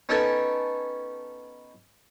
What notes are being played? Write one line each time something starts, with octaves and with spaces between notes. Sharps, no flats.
B3 C#4 D#4 A4 G5 G#5